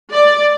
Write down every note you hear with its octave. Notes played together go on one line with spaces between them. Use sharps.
D5